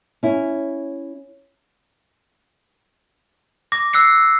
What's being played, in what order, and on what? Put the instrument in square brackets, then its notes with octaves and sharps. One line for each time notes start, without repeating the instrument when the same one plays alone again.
[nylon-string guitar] C#4 E4
[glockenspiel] D6 A#6
E6 F#6 C7 C#7